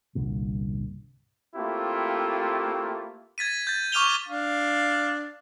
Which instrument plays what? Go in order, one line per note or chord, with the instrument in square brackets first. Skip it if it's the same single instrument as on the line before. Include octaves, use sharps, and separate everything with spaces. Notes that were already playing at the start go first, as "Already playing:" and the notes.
[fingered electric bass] G1 C2 G2 A#2
[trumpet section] A3 A#3 C4 E4 F4 G4
[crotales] G#6 A6 B6 D#7
G6 A6
C#6 D6 F6 D#7 F7 G7
[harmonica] D4 F5